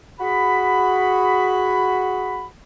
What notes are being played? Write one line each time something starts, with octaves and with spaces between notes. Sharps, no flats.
F#4 G#4 B5